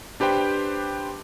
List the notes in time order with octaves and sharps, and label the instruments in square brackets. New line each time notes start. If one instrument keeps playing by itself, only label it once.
[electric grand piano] D4 G4 B4 C5 G5